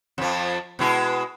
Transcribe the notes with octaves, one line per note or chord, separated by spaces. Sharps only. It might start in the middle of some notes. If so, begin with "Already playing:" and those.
F2 F3
B2 G#3 E4